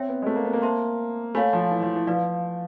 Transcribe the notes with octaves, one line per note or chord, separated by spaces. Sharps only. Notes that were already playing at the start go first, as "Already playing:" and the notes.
Already playing: C4 C#5 E5 G5
B3
G#3
A3
A#3
B3
A#3
C5 E5 A5 C6
A3 C#5 F5 G#5 B5
F3
E3
F3
E3
F3 B4 D5 F5